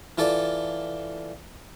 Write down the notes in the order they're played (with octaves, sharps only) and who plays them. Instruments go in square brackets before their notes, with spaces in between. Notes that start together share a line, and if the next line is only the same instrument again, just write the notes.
[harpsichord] E3 F4 A4 D5